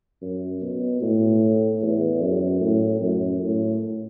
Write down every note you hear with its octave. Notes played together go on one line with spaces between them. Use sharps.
F#2
B2
A2
E2
F#2
A2
F#2
A2